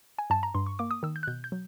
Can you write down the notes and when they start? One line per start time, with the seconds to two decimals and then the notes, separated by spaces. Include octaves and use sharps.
0.18 G#5
0.30 G2 A5
0.43 A#5
0.55 G2 C6
0.66 C#6
0.79 A#3 D6
0.91 D#6
1.03 D#3 E6
1.16 G6
1.23 F#6
1.27 B2 G6
1.44 G6
1.52 F#3